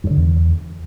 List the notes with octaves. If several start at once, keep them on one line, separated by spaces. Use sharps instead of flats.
G2
D3
E2